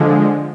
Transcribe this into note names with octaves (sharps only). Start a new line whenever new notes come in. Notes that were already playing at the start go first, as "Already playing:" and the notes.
Already playing: D3 F3 G#3